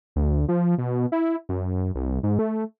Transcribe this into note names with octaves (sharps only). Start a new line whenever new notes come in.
D2
F3
B2
E4
F#2
C2
G#2
A3